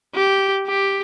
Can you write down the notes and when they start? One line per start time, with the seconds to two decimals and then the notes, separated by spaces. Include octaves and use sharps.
0.15 G4
0.67 G4